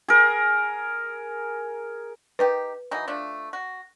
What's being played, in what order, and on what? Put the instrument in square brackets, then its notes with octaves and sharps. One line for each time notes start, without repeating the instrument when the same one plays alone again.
[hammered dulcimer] G#4 A#4
[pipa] D#3 D#4 G4 [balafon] B4
[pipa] E3 F#3 D#4
F3 A3 D4
F#4